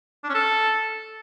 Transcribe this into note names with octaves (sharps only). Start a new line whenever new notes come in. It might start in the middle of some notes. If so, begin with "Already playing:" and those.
D4
C#4
A4